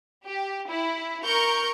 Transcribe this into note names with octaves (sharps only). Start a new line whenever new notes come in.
G4
E4
A#4 C#6 G6